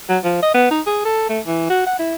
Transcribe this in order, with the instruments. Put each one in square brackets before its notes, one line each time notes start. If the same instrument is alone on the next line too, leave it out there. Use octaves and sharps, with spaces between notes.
[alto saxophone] F#3
F3
D#5
B3
D#4
G#4
A4
A3
E3
F#4
F#5
E4